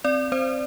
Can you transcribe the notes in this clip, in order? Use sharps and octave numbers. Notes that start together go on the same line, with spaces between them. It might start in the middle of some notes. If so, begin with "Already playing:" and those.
C4 D5
C4 C5